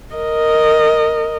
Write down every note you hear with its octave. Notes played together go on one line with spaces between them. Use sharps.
A#4 D#5